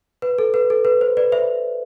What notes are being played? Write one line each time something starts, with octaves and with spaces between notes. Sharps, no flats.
B4
A4
B4
A4
B4
C5
B4 D5
C5 E5